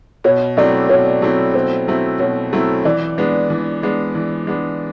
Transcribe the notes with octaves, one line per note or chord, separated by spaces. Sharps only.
B2 C#5
F#3 A3 C4 E4 D5
B2 C#5
F#3 A3 C4 E4
B2 C5
F#3 A3 C4 E4
B2 C#5
F#3 A3 C4 E4
E3 D5
G#3 B3 D4
E3
G#3 B3 D4
E3
G#3 B3 D4